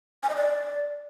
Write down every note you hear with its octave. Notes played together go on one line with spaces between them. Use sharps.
G#5
D#5
D5